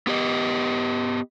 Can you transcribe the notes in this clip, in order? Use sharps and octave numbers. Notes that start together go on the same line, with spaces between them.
B3 G4 D#5